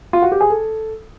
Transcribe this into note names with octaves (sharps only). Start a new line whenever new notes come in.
F4
F#4
G4
G#4
A4